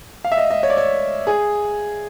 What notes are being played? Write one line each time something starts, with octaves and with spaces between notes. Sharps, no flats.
F5
E5
D#5
D#5
C#5
D5
C#5
G#4